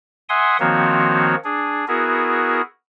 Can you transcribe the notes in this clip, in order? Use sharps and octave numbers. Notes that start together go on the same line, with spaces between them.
E5 F#5 G#5 C6 D#6
D#3 F3 A#3 C4 F#4 C#5
D4 G#4
B3 E4 F#4 G#4 A#4